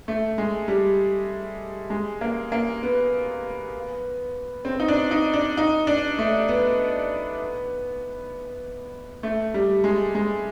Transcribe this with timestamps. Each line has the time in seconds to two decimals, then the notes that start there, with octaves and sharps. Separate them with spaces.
0.08 A3
0.38 G#3
0.68 G3
1.90 G#3
2.21 A#3
2.52 A#3
2.83 B3
4.65 C4
4.80 D#4
4.88 D4
5.11 D#4
5.33 D4
5.57 D#4
5.87 D4
6.19 A3
6.48 B3
9.23 A3
9.54 G3
9.84 G#3
10.15 G#3